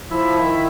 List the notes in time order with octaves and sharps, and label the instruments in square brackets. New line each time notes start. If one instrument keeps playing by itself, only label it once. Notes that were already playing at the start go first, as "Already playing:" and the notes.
[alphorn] F3 [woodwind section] E4 E5
[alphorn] D#3